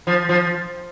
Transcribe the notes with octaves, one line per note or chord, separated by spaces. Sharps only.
F3
F3